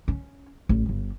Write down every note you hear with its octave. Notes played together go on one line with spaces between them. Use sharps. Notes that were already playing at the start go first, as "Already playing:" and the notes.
C#4
A1
G1